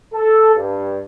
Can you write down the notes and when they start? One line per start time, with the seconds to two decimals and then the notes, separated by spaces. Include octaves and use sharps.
0.13 A4
0.55 G2